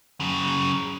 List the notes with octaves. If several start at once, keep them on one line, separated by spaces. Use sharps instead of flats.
F#2 C#3